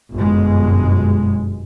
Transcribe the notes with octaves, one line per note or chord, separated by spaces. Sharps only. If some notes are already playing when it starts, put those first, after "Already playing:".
G1 F#2 B2 G#3